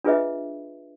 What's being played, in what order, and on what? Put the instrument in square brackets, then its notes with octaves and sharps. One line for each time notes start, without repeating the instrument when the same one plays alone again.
[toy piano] D4 F4 G#4 B4 D#5 E5